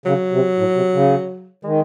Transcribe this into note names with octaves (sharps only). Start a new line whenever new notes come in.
C#3 F#3
C3
A2
C3
C#3
D#3 G#3